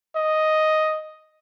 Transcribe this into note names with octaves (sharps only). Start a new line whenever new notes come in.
D#5